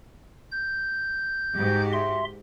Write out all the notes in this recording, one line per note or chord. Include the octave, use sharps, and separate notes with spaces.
G6
G#2 F#4 G4
E5 C6